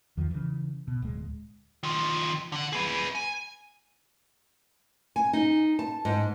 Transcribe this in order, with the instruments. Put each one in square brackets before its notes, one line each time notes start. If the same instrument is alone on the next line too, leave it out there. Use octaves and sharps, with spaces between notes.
[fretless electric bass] E2 D#3 F3
C#3 E3
B2
D1 G#3
[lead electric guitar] D#3 F3
D3 F#5
G#4 B4
G#5
[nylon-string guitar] G#5
D#4
A5
G#2